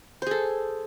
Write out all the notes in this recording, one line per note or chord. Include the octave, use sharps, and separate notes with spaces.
G#4 A4 C5